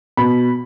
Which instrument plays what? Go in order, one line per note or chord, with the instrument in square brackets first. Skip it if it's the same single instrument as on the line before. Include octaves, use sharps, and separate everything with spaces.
[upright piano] B2 B5